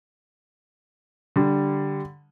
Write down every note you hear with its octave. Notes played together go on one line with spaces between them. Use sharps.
D3 G3